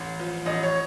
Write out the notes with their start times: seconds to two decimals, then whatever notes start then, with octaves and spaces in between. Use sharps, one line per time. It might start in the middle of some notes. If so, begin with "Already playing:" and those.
Already playing: A1
0.20 F3
0.46 A1 D#5
0.63 C#5